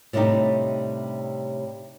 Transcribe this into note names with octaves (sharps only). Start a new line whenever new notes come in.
A2 C3 G3 D4 D#4 G4